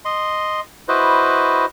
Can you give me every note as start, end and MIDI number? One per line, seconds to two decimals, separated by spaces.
0.05 0.60 75
0.05 0.60 84
0.88 1.65 64
0.88 1.65 66
0.88 1.65 71
0.88 1.65 72
0.88 1.65 75